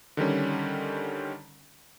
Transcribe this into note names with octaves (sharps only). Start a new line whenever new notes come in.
D3 D#3 G3 C#4